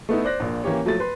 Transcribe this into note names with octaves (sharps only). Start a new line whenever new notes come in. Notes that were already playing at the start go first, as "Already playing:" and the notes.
A3 B3 D#4 E4
C5 D5 F#6 A#6
A#1 A#2
E3 A#3 C#4 G4 C#5
F3 F#3 A3 A6
B4 C6